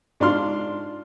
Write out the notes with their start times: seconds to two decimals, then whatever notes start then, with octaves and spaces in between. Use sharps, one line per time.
0.20 G#2 D4 F4 C6 F6